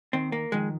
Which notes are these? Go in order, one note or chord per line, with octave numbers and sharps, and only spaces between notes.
D#2 D#3 C4
A#3
F2 D#3 G#3